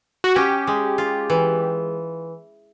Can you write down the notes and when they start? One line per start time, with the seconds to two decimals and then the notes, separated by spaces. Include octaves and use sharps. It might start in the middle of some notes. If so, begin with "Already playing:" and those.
0.24 F#4
0.36 C#4 G4
0.67 G#3
0.98 F4
1.30 E3